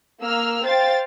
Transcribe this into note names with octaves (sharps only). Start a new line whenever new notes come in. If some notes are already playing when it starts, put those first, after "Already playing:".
A#3 E6 F6
C5 F5 G5 A6